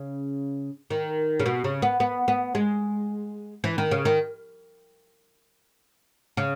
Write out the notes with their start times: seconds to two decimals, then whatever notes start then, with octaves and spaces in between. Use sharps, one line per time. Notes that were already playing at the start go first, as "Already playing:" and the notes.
Already playing: C#3
0.90 D#3
1.39 C#3
1.46 B2
1.64 C#3
1.82 B3
2.00 B3
2.28 B3
2.55 G#3
3.64 E3
3.78 D#3
3.91 C#3
4.05 D#3
6.37 C#3